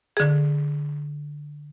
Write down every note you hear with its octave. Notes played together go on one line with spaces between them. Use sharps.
D3 G#4